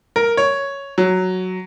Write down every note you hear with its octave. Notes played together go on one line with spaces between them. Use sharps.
A#4
C#5
F#3